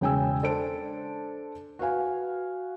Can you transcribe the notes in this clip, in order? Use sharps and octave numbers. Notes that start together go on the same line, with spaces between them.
E1 C#3 G5 G#5 E6
D4 A4 C5 A5 D7
F#4 B4 F5 G#5